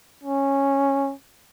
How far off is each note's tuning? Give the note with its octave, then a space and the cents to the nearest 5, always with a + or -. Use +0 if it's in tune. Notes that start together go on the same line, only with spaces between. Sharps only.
C#4 -10